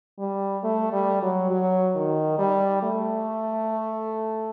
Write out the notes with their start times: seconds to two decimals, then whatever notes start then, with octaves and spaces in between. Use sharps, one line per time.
0.19 G3
0.63 A3
0.92 G3
1.22 F#3
1.50 F#3
1.95 D#3
2.38 G3
2.83 A3